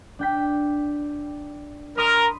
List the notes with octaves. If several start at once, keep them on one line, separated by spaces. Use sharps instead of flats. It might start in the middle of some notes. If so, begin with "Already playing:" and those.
D4 G5 B6
A#4 B5 C6 D#6